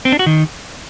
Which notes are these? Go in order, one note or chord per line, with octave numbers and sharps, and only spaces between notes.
C4
D4
F#4
D#3